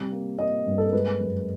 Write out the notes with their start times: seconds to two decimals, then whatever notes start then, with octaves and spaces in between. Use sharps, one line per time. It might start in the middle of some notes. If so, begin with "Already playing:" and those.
Already playing: C3 G3
0.12 A#3
0.38 A#3 D#5
0.67 G2
0.78 A4
0.86 A#4
0.93 G#3 B4
1.21 F#2